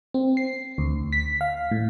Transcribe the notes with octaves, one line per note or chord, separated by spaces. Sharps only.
C4
C7
D2
B6
F5
A2